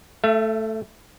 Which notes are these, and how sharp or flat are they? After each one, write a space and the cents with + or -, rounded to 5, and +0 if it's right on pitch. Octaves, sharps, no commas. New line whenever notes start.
A3 +0 E5 +40